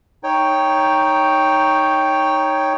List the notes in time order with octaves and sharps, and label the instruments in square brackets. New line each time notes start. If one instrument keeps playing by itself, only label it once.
[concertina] D#4 C#5 G5